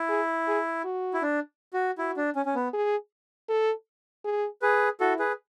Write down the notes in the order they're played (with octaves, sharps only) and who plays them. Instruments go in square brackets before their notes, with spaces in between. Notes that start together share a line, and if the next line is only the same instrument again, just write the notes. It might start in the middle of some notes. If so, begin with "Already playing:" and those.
Already playing: [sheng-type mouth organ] E4
[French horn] G#4
G#4
F#4
[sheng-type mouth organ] E4
D4
F#4
[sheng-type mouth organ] E4 [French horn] F#4
[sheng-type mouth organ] D4
C#4
C#4
B3
[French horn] G#4
A4
G#4
[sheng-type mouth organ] G#4 B4
[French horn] E4 [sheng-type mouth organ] F#4 A4
[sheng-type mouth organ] G#4 B4